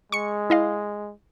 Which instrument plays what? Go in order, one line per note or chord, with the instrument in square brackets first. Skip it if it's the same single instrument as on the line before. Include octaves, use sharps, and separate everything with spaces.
[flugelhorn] G#3 [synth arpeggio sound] C#6 C#7
[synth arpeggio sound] E4 D#5 F5